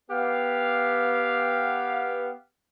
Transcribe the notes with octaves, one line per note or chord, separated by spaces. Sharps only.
B3 G4 F5